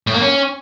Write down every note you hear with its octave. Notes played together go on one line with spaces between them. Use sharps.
A2
A#3
C#4